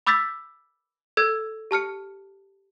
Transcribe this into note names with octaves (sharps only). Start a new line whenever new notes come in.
B5 D6 E6 G6 A6 B6
A4 E6 G#6
G4 A5 F6 C#7